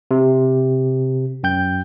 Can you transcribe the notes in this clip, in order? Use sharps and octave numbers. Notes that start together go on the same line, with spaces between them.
C3
F#2 G5 G6